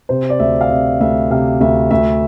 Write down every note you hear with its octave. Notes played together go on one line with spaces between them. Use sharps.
C3 C5
D5
D2 E5
F5
C3 E5
D2 E5
C3 F5
D2 E5
D2 E5